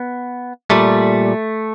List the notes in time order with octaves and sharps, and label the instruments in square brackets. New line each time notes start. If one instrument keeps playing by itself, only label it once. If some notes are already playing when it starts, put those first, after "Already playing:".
Already playing: [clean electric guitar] B3
A#2 G3 A3